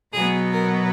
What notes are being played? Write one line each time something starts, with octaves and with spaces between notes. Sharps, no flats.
B2 F#3 B3 G#4
A#4